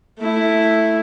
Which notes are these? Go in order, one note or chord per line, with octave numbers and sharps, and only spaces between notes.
A3 E4